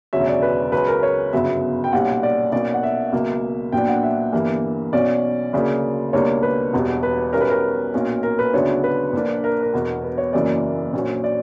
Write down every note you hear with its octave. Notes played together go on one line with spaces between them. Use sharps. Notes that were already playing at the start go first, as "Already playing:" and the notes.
E1 D2 C#3 F#3 C#4 E5
D5
B4
C#2 C#3 F#3 C#4 B4
A#4
C#5
G1 F#2 C#3 F#3 B3 E5
G5
B1 A#2 G3 C#4 F#5
D5
B1 B2 A#3 C#4 D5
F#5
E5
C#2 B2 F#3 A#3
A#1 A#2 F#3 B3 D4 G5
F#5
E5
G1 G2 E3 A#3
B1 B2 F#3 C#4 D5
D2 C#3 F#3 A#3 D5
C#2 B2 G3 A#3 D4 C#5
B4
E1 E2 B2 G3
B4
B1 B2 G3 C#4 A#4
B4
A#4
B1 A#2 F#3 C#4
A#4
B4
D2 C#3 F#3 B3 D4 C#5
B4
A#1 A#2 A#3 D4
A#4
A#4
E1 E2 B2
B4
C#5
F#1 F#2 E3 A#3 C#4 D5
A#1 A#2 F#3 C#4
D5